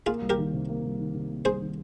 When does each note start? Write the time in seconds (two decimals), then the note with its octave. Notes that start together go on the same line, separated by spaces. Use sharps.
0.06 A#3 F4 G#4
0.22 C2
0.30 G4 A#4
0.38 D#3
0.53 C3
0.69 A#3
0.83 C2
0.99 D#3
1.15 C3
1.30 A#3
1.45 C2 G#4 C5
1.61 D#3